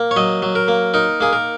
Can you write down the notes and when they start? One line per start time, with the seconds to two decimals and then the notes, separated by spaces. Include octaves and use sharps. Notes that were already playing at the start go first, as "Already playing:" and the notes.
Already playing: A#3
0.11 C#5
0.16 F#3 D#5
0.42 F#3
0.55 A#4
0.68 A#3
0.94 D#4 A#4
1.21 A#3 G#4
1.33 A#4